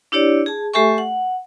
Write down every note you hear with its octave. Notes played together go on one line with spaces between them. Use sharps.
D4 E4 G4 C#5 D5
G#4 A5
A3 G4 A4 E5 G#5 C#6
F#5